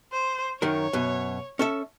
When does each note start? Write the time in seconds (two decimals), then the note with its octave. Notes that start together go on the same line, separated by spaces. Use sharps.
0.13 C5
0.62 F#2 D#3 A#4 C#5
0.93 F#2 B2
1.59 C#4 A4 E5